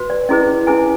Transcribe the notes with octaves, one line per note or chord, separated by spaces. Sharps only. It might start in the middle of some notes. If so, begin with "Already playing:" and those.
Already playing: F#4 B4
D5
C#4 E4 G#4 B4 D#5
C#4 E4 G#4 B4 G#5